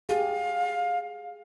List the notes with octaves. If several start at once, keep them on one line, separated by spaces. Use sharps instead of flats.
G4 G#4 F5